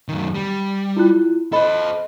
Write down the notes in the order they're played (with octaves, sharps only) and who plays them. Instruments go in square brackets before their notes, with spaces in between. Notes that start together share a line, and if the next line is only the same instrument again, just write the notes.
[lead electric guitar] F#2 D#3
G3
[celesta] E4 F4 F#6
[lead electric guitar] A4 C5 [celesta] D#5 B5